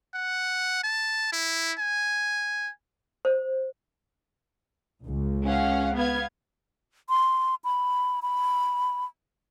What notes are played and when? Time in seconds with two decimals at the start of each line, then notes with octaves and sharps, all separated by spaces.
0.14 F#5
0.84 A5
1.33 E4
1.79 G#5
3.25 C5
5.04 C#2
5.45 C#4 F5 F#5
5.95 B3 F5 G#6
7.09 C6
7.64 B5
8.22 B5